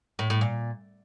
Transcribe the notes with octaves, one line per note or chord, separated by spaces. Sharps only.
A2
A2
A#2